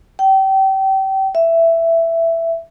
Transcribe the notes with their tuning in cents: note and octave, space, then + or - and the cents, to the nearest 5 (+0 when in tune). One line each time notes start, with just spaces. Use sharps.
G5 -30
E5 +10